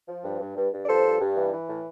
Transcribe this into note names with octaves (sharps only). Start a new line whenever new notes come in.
F3
G2
G2
G2
G2
D5
F3 A4 C5
G2
G2
E3
E3
A2